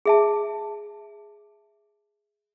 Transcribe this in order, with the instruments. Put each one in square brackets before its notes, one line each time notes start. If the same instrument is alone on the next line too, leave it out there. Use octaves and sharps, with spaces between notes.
[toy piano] G#4 E5 A5